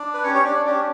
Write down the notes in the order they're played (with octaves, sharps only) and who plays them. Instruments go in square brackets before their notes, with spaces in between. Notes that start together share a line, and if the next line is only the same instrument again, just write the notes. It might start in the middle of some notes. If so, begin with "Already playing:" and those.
Already playing: [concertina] D4 D5
B4
C#4 G4 C#5
C#5
D4 D5
C#4 D4 G4 D5